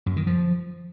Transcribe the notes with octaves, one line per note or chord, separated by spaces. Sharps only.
F#2
D#3
F3